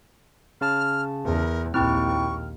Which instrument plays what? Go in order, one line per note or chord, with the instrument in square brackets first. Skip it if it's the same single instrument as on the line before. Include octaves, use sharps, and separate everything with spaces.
[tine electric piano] C#3 A5 [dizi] F6
[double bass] E2 [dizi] A#4
[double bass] A#1 D#2 [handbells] C4 E4 G5 [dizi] C#6 [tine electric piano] F6